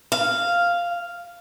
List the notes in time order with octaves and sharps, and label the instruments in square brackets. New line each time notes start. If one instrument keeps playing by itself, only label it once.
[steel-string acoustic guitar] F5